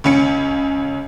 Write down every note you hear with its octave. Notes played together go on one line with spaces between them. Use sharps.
C#2 C#4 C#7